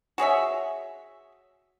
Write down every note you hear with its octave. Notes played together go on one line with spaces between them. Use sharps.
F#4 G#4 C#5 E5